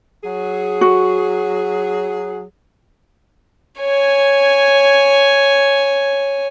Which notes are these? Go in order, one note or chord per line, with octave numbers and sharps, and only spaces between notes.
F#3 G#4
F#4
C#5 G#5